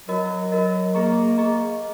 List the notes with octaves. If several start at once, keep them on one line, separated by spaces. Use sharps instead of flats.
F#3 F#4 A#4 D#5
F#4 A#4 D#5
A#3 G#4 D#5 A#5 C#6
A#3 G#4 D#5 A#5 C#6